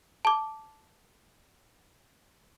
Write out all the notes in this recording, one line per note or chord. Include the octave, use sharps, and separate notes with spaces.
A5 D6